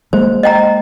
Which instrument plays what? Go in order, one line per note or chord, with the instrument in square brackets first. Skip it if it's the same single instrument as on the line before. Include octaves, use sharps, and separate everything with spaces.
[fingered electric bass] G#3 A#3 [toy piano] C5
[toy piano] D#5 G5 A#5